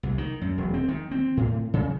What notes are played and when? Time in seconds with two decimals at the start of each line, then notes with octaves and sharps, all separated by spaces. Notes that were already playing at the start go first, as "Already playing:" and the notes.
0.03 C2
0.18 D#3
0.41 F#2
0.58 E1
0.74 C4
0.88 D#3
1.11 C4
1.37 A2
1.74 C#3